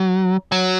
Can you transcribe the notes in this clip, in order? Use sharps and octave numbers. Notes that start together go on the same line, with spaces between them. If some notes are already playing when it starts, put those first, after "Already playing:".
Already playing: F#3
F#3